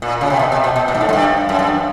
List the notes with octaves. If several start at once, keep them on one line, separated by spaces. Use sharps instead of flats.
A#2
C#3
C3
B2
C3
B2
B2
A#2
G#2
A2
G#2
G2
F#2
G2